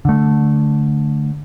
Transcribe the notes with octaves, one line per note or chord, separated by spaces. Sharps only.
D3 A3